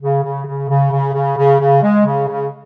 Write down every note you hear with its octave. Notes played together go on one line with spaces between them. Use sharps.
C#3
C#3
C#3
C#3
C#3
C#3
C#3
C#3
G#3
C#3
C#3